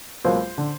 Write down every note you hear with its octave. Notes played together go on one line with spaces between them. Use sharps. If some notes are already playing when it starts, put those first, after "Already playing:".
C#2 B2 F#3 A#3 C5
D3